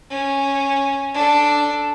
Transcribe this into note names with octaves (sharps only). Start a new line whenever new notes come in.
C#4
D4 A4